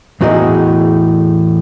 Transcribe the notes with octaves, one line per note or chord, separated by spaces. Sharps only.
E2 A2 D#4 F#4 G#4 A#4